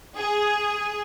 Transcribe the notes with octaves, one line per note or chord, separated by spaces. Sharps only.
G#4